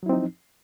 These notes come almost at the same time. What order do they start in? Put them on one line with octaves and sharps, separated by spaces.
F#3 E4 C4 D#4 F3